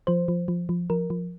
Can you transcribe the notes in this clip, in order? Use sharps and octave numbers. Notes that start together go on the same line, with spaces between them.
F3 C5
F3
F3
F3
F3 A#4
F3